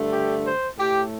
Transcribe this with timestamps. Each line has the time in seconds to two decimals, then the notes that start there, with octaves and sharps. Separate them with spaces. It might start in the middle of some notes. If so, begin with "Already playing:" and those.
Already playing: G2 D3 A3
0.11 G4
0.45 C5
0.78 A2 A3 G4